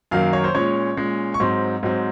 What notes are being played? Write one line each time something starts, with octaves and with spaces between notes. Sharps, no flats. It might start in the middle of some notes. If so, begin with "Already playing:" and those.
F#2 D#3 F#3 A#3 F5
C#5
C5
A#2 G#3 C#4 C#5
A#2 G#3 C#4
C#6
G#2 F#3 C4 C6
G#2 F#3 C4